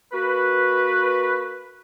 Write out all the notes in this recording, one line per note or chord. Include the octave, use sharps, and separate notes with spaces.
A#3 F#4 B4